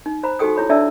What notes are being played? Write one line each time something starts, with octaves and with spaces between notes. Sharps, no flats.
D#4
C5 A#5 B5
D#4 F#4 G4 A4 G5 D#6
E4 C#5 B5
D4 A4 D5 E5 A5 E6